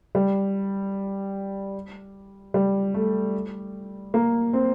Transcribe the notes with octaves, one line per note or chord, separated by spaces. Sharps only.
G3
G3
A3
A#3
C4